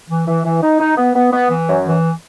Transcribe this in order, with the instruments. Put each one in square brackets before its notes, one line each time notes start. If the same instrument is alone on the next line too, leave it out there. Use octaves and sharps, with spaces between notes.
[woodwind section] E3
E3
E3
D#4
D#4
B3
B3
B3
E3
F#2
E3